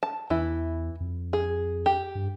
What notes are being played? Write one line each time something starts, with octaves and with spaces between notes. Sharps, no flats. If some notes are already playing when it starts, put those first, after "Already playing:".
A5
E2 E3 E4
F2
G#4
G4
G2